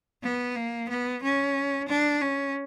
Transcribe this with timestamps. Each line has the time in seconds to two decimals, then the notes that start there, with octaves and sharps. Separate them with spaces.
0.23 B3
0.56 A#3
0.89 B3
1.22 C#4
1.88 D4
2.21 C#4